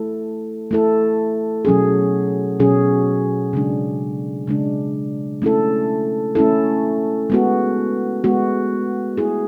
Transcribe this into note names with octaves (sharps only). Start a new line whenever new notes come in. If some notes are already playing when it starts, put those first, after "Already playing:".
Already playing: A3 E4 A4
A3 E4 A4
B2 F#3 C#4 G#4
B2 F#3 C#4 G#4
C#3 G#3 D4
C#3 G#3 D4
A3 C#4 E4 A4
A3 C#4 E4 A4
G#3 B3 F#4
G#3 B3 F#4
A3 E4 G#4